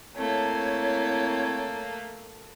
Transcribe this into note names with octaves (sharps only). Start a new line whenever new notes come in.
A3 A#3 C4 E4 C#5